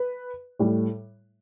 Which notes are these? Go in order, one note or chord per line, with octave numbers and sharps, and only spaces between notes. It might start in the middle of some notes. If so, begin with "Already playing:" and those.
Already playing: B4
A2 G3